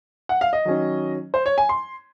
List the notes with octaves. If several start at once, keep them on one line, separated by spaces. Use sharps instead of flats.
F#5
F5
D#5
D#3 F#3 C#4
C5
C#5
G#5
C6